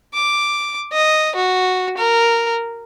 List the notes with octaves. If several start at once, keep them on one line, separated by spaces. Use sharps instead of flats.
D6
D#5
F#4
A#4